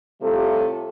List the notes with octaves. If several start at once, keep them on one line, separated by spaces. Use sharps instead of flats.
A2 C3 G3 A3 F4 A4